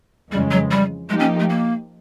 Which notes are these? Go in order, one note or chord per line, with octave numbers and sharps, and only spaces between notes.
F2 C#3 E3 G3 G#3
F#3
G3
F3 G#3 A#3 D#4 G4
C#4
A3
A#3